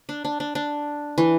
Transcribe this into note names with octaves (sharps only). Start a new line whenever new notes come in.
D4
D4
D4
D4
E3